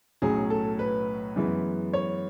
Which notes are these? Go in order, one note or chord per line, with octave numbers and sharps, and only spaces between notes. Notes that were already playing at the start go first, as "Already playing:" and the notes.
B1 A2 F#3 C#4 G#4
A4
B4
F#2 E3 G#3 B3
C#5